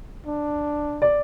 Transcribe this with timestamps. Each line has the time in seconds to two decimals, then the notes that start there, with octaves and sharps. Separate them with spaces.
0.26 D4
1.02 D5